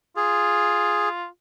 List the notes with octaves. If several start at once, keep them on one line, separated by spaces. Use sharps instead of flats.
F4 G#4